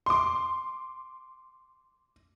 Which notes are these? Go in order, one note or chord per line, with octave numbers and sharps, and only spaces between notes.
C6 D6